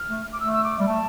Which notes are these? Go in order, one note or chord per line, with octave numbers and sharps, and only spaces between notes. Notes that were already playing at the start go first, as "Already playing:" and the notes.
Already playing: F6
A3
D6
A3 E6
E6
D6
G3
A3 A5